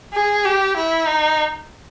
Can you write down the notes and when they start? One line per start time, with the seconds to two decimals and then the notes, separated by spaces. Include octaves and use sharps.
0.14 G#4
0.45 G4
0.77 E4
1.08 D#4